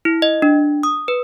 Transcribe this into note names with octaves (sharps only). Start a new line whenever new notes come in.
E4
D#5
D4
D#6
B4